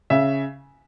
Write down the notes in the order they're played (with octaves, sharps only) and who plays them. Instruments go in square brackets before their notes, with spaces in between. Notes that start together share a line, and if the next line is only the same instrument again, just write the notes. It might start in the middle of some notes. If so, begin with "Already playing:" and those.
[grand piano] C#3 E5